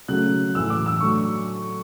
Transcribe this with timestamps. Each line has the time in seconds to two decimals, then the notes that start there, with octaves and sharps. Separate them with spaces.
0.08 C#3 F#3 A3 F#6
0.55 A2 E3 A3 E6
0.70 D6
0.86 E6
1.01 D3 F#3 A3 C#6